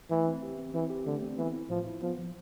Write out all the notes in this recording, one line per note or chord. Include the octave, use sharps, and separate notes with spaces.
E3 A3
C4
G4
C4
E3 C4
G4
D3 A3
C4
E3 B3
E4
A2 F3
E4
F3 B3
F3